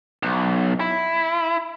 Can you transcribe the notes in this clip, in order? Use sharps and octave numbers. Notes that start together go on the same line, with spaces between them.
B1
E4